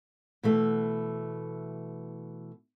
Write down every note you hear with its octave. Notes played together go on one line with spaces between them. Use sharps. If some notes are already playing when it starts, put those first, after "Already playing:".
B2 E3 A3